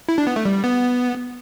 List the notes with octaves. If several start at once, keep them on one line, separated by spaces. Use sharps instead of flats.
E4
D4
B3
A3
G3
B3